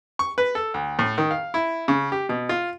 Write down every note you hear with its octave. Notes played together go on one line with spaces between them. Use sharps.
C#6
B4
A4
D2
A2
D#3
F5
E4
C#3
G4
B2
F4